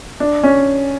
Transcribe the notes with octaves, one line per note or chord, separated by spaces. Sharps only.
D4
C#4